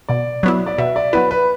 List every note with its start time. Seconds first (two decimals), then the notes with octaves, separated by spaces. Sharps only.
0.09 B2 D5
0.43 F#3 B3 E4
0.66 D5
0.78 B2 E5
0.96 D5
1.13 F#3 B3 E4 B4
1.31 B4